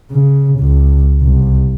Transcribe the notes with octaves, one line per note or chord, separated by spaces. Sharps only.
C#3
C#2
C2